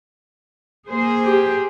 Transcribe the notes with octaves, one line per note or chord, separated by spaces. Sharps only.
A#3 G#4 C5
G4